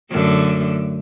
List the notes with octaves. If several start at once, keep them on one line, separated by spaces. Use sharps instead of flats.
F#2 D3 A3